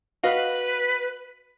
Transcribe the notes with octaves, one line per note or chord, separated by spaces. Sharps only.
F#4 B4 D#5 F5